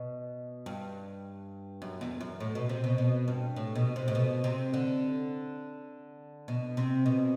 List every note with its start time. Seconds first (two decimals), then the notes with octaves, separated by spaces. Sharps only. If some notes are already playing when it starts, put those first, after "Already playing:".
Already playing: B2
0.66 G2
1.82 F#2
2.01 E2
2.21 F#2
2.40 A2
2.55 B2
2.69 C3
2.84 B2
2.98 B2
3.28 G2
3.56 A2
3.75 B2
3.96 C3
4.08 A2
4.15 B2
4.44 C3
4.74 D3
6.48 B2
6.77 C3
7.06 B2